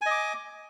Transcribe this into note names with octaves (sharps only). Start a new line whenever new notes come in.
D#5 G#5 D6